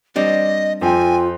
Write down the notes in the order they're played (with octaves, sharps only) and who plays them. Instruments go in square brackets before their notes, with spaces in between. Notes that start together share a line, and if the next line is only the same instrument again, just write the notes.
[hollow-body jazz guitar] G3 C4 D4 [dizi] D#5
[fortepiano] F2 G5 [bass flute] F4 [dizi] G#5